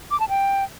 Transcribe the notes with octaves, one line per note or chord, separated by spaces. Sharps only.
D6
A5
G5